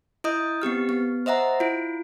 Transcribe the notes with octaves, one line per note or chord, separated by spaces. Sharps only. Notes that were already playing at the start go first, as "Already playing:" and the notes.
E4 D#5 D#6 G6
B3 C4 G4 F6
B3
C5 D#5 E5 F#5 A#5
E4 F4